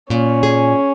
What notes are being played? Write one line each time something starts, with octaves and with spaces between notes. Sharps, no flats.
A#2 C#4
G#4